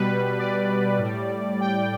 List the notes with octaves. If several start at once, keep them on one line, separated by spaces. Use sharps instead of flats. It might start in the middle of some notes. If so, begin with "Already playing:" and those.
Already playing: B2 G3 B4
D5
A2 G3
G5